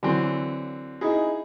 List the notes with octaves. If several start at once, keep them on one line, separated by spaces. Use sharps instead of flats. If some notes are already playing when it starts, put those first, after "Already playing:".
D3 E3 F#3 C4
D#4 E4 G#4